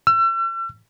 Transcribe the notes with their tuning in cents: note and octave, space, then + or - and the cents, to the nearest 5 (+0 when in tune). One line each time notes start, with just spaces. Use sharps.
E6 +40